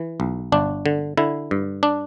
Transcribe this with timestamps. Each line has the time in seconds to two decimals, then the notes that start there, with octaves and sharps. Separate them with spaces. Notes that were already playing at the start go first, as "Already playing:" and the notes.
Already playing: E3
0.20 B1
0.52 G1 D4
0.86 D3
1.17 D3 E4
1.51 G2
1.83 D4